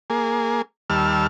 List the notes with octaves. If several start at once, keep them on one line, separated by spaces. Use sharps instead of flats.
A#3 G#4
D#2 G3 A5 E6 F6